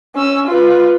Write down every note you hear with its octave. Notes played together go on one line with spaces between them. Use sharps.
C#4 E6
F4 B4